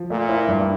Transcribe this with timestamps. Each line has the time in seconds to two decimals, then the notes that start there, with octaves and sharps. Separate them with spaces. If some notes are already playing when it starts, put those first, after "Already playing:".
Already playing: F3
0.10 A#2 A3
0.29 E4
0.48 G2